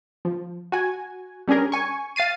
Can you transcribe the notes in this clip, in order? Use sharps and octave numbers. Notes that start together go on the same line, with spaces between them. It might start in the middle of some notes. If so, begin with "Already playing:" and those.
F3
F#4 G#5
G3 C#4 D4 G#4 A#4
G#5 C#6
F5 A6 C7 D#7